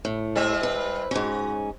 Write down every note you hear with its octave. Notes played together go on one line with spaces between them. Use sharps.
A2
G3 C4 E5
B4
G#2 C#4 F#4